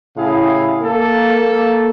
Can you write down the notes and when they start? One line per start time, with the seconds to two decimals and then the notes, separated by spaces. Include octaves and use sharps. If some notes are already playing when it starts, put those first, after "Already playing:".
0.17 A2 C#3 E4 G4 G#4 F5
0.82 A#3 A4